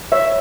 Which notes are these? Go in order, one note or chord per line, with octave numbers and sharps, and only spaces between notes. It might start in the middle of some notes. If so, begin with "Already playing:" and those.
C#5 E5